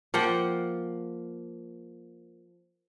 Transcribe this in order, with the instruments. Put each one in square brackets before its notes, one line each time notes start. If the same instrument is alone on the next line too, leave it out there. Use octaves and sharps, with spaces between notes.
[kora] F3 A#3 F#5 G5